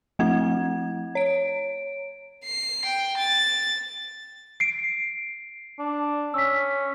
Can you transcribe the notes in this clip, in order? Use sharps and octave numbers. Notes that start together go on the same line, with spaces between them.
F3 A3 C4 E4 F#5 G#6
C#5 D7
C7
G5
A6
C7 D7
D4
C#4 E6 B6